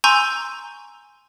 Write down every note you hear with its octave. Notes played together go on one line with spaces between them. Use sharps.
G#5 A#5 C6 C#6 E6 G6